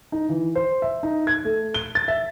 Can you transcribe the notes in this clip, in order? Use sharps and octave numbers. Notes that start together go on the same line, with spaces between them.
D#4
E3
C5
E5
D#4
G#6
A3
G7
A6
E5